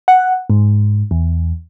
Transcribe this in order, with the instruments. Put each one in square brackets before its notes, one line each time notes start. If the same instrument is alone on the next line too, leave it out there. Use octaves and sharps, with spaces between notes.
[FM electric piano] F#5
G#2
E2